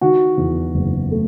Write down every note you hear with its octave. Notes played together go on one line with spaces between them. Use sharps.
D#3 F#4
E2
F#1
A3